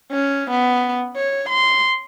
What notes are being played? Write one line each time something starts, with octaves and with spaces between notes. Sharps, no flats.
C#4
B3
C#5
C6